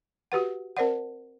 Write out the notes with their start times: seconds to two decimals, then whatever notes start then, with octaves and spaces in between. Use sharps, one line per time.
0.32 F#4 G4 B4 F#5
0.77 C4 A#4 C5 D5 F#5